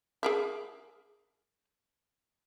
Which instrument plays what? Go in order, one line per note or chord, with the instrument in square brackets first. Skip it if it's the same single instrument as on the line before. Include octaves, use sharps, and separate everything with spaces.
[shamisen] G#4 A#4 E5